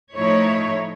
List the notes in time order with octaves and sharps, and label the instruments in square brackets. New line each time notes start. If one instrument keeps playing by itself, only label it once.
[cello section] A2 F3 A3 D#4 E4 C#5